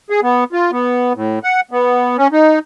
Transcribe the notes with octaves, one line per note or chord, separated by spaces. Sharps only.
G#4
B3
F4
B3
A2
F#5
B3
C#4
D#4